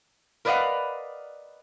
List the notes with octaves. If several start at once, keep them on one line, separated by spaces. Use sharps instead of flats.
A#4 B4 D5 D#5 F5 F#5